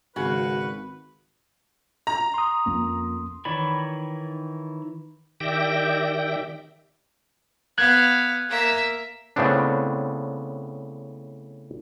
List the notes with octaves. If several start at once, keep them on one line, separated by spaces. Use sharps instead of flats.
G#1 C#3 F#4 B4
A#5
C6 D#6
F2 A#3 C#4
D#3 E3 C#5 D5 B5
D#3 G4 D5 E5 G5 A#6
B3 F5 F#6 G#6
A#3 E5
A2 C#3 B3 C4 D4